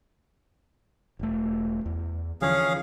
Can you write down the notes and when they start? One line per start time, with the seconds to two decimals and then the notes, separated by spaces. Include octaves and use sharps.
1.19 E1 A3
1.86 E2
2.42 D3 E3 F3 C#4 G#4 F5